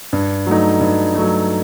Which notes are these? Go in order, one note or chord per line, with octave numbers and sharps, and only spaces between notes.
G2
F#3 A3 D#4
G2
F#3 A3 D#4